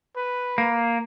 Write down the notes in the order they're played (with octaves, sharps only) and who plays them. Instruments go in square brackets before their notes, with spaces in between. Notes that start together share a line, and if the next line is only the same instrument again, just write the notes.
[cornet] B4
[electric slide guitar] A#3